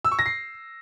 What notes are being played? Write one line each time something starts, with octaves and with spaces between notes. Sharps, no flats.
E6
C#6
A#6
C7